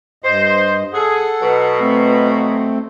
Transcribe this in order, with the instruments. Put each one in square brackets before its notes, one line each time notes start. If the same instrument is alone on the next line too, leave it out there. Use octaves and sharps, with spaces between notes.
[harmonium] G2 D#5 [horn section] C5
[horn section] G#4 [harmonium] A4 F#5
[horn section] B2 F#3
[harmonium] A3 C4